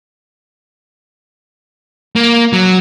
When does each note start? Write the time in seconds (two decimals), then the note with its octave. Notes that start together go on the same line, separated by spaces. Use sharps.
2.16 A#3
2.53 F#3